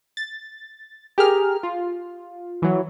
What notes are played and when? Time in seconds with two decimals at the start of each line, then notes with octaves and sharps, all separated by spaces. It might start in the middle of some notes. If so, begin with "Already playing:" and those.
0.17 A6
1.18 G4 G#4 A#4 F6
1.63 F4
2.62 E3 F#3